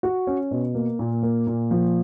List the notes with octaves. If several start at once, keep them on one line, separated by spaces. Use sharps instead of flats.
F#4
C#4
B2
A#3
A#2
A#3
A#2
F3